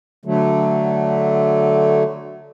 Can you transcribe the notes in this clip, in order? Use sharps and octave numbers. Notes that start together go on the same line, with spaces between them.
D3 F#3 A3